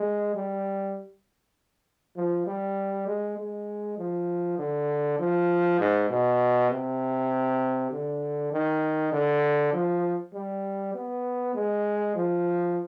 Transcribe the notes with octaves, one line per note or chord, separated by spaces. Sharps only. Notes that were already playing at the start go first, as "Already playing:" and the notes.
Already playing: G#3
G3
F3
G3
G#3
G#3
F3
D3
F3
G#2
B2
C3
D3
D#3
D3
F3
G3
B3
G#3
F3